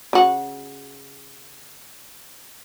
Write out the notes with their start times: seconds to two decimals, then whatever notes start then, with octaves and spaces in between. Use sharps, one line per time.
0.13 C#3 F#4